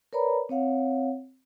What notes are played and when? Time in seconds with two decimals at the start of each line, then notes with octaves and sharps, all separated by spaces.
0.13 A#4 B4 C#5 D5 A#5 B5
0.49 C4 C#5 F5 F#5